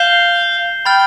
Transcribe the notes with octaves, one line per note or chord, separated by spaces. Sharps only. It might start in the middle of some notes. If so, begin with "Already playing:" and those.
Already playing: F5 G6 C7 E7 G7
G5 B5 F6 A6